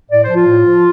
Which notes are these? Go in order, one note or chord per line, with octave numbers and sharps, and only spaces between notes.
A2 D5
C5
F3
F4
A2
F3